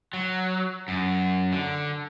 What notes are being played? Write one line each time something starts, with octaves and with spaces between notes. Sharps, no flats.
F#3
F#2
D3